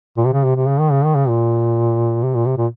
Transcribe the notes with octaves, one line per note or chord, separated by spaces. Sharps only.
A#2
C3
C#3
C3
C3
C#3
D#3
C#3
D#3
C#3
A#2
C3
A#2
C3
A#2